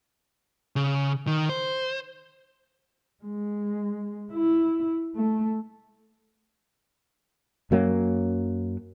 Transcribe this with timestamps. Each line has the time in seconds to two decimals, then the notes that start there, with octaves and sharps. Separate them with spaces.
0.76 C#3
1.27 D#3
1.49 C5
3.24 G#3
4.33 E4
5.15 A3
7.71 F#2 F#3 A#3 C#4